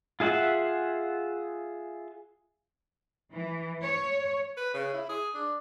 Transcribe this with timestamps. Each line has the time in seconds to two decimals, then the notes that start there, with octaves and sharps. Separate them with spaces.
0.20 F4 G#4 E5 F#5
3.33 E3
3.82 C#5
4.57 B4
4.74 C#3
4.93 E4
5.09 G#4
5.34 D4